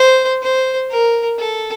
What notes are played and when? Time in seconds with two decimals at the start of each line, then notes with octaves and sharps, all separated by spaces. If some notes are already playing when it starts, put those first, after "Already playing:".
Already playing: C5
0.42 C5
0.91 A#4
1.39 A4